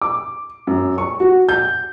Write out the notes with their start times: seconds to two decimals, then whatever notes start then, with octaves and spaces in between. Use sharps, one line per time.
0.02 D6
0.67 F#2
0.98 C#6
1.20 F#4
1.49 G6